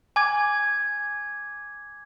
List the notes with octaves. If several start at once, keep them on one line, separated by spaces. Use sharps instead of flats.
G#5 D6 G#6